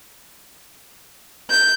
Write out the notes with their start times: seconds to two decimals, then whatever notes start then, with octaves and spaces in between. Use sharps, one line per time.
1.50 G6